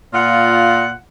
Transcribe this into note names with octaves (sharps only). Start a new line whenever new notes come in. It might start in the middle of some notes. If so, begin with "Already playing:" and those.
A#2 F4 F#5